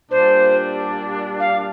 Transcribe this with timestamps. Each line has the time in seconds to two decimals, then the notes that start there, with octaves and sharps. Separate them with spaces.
0.11 A#2 G3 D4 C5
1.40 F5